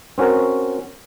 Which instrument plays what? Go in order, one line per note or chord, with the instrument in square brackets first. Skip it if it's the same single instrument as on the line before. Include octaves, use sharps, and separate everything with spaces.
[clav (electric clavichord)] C4 C#4 F#4 A#4